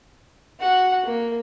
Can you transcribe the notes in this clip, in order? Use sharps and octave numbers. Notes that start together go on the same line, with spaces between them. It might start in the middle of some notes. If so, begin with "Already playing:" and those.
F#4 F#5
A#3